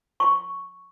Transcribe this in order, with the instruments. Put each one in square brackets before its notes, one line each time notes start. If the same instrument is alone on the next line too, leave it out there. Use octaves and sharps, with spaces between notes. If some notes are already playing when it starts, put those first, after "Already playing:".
[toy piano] C#6